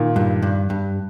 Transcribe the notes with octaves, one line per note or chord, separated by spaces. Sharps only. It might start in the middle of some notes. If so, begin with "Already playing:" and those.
Already playing: A#2 D#3
G2
G2
G2